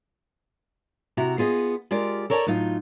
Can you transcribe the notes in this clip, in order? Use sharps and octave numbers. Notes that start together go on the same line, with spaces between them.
C3 E4 F#4 A#5
B3 F4 G#4 D#5
G#3 F4 G4 A#4 D5
A4 A#4 C#5 D5 F#5 A5
A2 F#3 D#4 F4